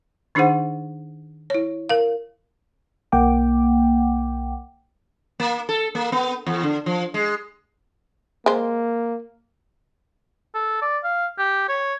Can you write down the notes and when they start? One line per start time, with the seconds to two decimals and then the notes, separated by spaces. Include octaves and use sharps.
0.35 D#3 D4 D#4 G#4 C5 F#5
1.50 E4 C#5
1.89 A#4 F5
3.12 B1 A#3 F#5 G5 D6
5.40 A#3
5.69 A4
5.95 A#3
6.12 B3
6.46 E2
6.63 D3
6.86 F3
7.14 G#3
8.46 G#3 A#3 C5
10.55 A4
10.82 D5
11.04 F5
11.38 G4
11.69 C#5